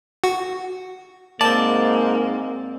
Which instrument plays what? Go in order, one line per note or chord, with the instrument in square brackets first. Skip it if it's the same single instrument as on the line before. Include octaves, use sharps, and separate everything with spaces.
[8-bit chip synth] F#4
[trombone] G#2 [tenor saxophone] A#3 [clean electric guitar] C4 D5 [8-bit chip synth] A5